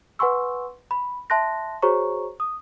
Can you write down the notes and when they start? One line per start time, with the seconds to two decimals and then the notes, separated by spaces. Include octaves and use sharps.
0.19 B4 F#5 G#5 C6 C#6 E6
0.91 B5
1.30 E5 A5 C6 F#6 A#6
1.82 F#4 G#4 C5 C#5 A#5 C#6
2.40 D#6